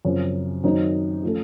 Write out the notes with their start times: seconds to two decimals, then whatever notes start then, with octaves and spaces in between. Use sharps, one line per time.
0.05 F#2 C#3 F3 C4
0.64 F#2 D#3 F#3 C4 D#4
1.23 F3 A3 C#4 A4